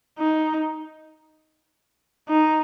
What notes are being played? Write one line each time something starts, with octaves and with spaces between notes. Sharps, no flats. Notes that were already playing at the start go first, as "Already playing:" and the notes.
D#4
D#4